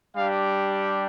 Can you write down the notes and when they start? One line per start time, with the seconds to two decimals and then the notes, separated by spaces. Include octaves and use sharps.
0.15 G3 D4 G4 F5